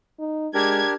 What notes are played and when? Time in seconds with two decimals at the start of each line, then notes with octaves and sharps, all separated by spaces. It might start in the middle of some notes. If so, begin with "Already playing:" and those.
0.19 D#4
0.55 G#3 D4 G4 A#4 G#6